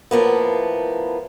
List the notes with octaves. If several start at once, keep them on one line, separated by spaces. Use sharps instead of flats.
A2 F3 A#3 B3